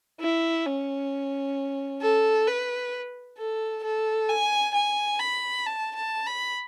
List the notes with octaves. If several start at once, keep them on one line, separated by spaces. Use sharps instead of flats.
E4
C#4
A4
B4
A4
A4
G#5
G#5
B5
A5
A5
B5